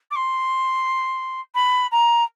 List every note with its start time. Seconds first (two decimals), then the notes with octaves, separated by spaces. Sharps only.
0.11 D6
0.16 C6
1.55 B5
1.91 A#5